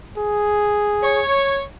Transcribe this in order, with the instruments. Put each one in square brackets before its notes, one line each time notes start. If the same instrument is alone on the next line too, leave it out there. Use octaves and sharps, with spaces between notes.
[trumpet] G#4
[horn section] C#5